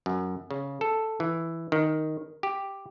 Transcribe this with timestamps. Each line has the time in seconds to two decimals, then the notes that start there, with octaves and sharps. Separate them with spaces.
0.06 F#2
0.51 C#3
0.81 A4
1.20 E3
1.72 D#3
2.43 G4